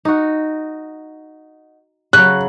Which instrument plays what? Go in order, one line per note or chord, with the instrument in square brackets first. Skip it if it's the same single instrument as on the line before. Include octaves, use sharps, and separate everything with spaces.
[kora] D#4 F#4
[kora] C#3 F#3 [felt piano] F#6